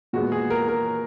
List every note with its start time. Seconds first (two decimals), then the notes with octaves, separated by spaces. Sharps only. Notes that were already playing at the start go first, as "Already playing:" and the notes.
0.13 A#2 G#3 B3 F#4
0.32 G#4
0.50 A#4
0.68 A#4